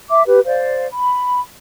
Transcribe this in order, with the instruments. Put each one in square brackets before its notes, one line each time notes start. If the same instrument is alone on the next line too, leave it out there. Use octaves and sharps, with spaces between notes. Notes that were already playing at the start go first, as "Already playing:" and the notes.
[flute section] E5 D6
G4 B4
C5 D5 F5
B5